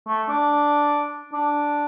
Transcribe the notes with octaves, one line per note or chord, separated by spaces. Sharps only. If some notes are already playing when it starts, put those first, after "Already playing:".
A3
D4
D4